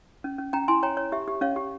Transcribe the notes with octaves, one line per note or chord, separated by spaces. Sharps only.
C#4
C#4
C#4 G5 A#5
E4 G#5 C6
C#5 G5 A#5
C#5
G4 E5
G4
C#4 C#5 F5
G4